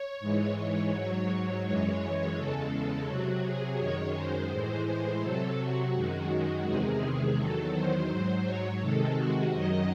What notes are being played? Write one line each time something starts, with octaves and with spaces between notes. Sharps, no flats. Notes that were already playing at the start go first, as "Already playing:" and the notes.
Already playing: C#5
G#2 E3 G#3
C#5
G#2 F#3
F#2 E3 G#3 C#5
E2 C#3 G#3 A4
C3 F#3 F#4
G#4
F#2 D#3 G#3 C#5
C5
A2 E3 G#3
C5
C3 F#3 A4
F#4
F#2 D#3 G#3
E2 C3 D#3 G#3 G#4
E2 D#3 F#3 A4
C5
G#2 F#3
C#5
C3 D#3 G#3 A4
F#4
F#2 D#3 F#3 D#5